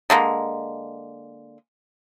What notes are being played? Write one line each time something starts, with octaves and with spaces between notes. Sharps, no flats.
D3 G#3 A#3